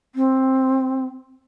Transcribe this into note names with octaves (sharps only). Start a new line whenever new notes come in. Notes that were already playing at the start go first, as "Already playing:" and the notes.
C4